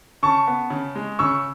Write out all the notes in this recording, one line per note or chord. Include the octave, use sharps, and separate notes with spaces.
C#3 A5 C#6
B3
C#3
G#3
C#3 C#6 E6